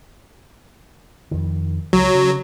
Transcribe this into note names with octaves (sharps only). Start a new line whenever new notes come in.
F2 D#3
C#2 F#3
C#3